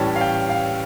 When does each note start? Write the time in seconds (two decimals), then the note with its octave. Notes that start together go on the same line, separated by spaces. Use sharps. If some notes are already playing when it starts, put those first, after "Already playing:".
Already playing: A2 E3 G3 C#4 G5 A5
0.16 F5
0.21 G5
0.50 F5